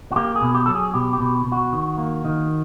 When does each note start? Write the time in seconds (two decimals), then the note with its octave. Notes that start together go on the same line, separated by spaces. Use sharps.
0.12 F#4
0.16 A#3 G4
0.36 G#4
0.42 B2
0.55 G4
0.66 F#3 A4
0.75 G#4
0.94 B2 G4
1.13 G4
1.19 B2
1.46 B2
1.52 F#4
1.73 D#3
1.98 A#3
2.25 D#3